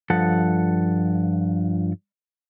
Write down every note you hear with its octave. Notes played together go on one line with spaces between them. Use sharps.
G2 F3 A4 F#5